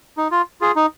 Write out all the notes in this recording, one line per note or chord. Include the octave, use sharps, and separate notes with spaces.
D#4
F4
F4 G#4
D#4